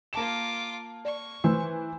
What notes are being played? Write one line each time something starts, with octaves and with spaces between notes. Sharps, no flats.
A#3 F4 A5 D6 E7
D5 C#6
E3 A3 C5 E6